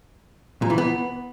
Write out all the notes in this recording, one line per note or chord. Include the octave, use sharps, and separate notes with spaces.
A#2
E3
B3